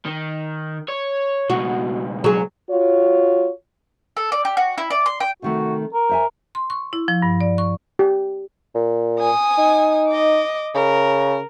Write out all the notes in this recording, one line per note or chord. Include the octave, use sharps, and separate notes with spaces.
D#3
C#5
C#2 B2 F#4
F#3 G#4
F4 F#4 C#5
A4
D5
G4
F#4
E4
D5
C6
G5
C3 D#3 A3 F#4
A#4
C5 E5 G#5
C6
C#6
E4
F3
G2
D5
C#6
G4
A#2
G#5 D#6
D#4
D#5 D6
C#3 A#4